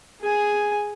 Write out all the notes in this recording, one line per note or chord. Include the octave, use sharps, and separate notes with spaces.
G#4 G#5